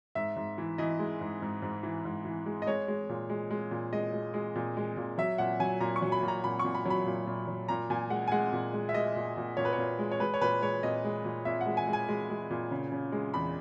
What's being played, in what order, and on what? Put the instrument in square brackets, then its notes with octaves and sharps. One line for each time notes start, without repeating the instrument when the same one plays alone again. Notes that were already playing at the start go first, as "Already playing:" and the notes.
[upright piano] G#2 E5
G#2
E3
E3 D#5
G#3
G#2
G#2
G#2
E3
G#2
E3
G#3
D#5
G#3 C#5
G#3
A#2
G#3
G#3
A#2
G#3 D#5
G#3
G#3
A#2
G#3
A#2
F#3 E5
A#2 F#5
F#3 G#5
A#2 A#5
C#6
F#3
B5
A#2
A#5
A#2 B5
A#2 C#6
B5
F#3 B5
A#2
A#2
F#3
A#2 A#5
A#2 G#5
G#3 F#5
G#5
G#3 F#5
A#2
G#3
E5
G#3 D#5
A#2
A#2
A#2 C#5
B4
C#5
A#2
G#3
C#5
G#3 B4
C#5
A#2 B4
G#3 C#5
A#2 D#5
G#3
A#2
A#2 E5
F#5
G#3
G#5
G#3
G#5
G#3
G#3
A#2
C#3
C#3
G#3
E2 B5